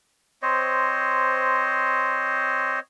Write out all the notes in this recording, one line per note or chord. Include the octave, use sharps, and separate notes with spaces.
C4 C5 C#5 D#5